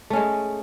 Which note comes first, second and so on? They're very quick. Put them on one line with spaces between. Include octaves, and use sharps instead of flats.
A3 C#4 G#3